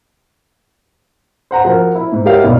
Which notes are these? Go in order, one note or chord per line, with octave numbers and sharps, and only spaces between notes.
C5 F#5 A#5
F3 F#4 A#4
E4
G#2
F#4 G4 A#4 C#5 E5 F5
B1 G2 B2